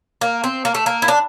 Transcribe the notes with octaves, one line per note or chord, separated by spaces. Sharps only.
A#3
C4
A#3
A3
A#3
E4
D4